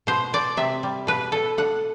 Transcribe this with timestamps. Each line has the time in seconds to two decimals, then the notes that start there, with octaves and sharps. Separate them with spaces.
0.07 B2 C5
0.33 B2 D5
0.57 C3 E5
0.83 G3
1.07 B2 B4
1.32 B2 A4
1.58 D3 F#5